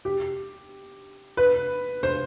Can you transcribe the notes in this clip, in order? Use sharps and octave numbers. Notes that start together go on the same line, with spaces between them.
G4
B4
C5